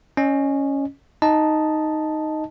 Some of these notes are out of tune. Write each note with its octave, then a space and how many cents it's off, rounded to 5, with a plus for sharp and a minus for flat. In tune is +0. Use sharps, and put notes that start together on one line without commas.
C#4 +0 D#5 -30
D#4 +0 D#5 +0 A5 -5